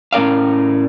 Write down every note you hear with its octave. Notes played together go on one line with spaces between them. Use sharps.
A2 C#4 A#4 D5 F5